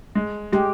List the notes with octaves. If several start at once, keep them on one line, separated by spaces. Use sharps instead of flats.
G#3
G#3 G4